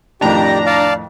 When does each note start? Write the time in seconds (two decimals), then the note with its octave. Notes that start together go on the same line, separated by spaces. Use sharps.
0.21 F2 A2 D#3 D4 G4 A#5
0.66 D5 F5 A5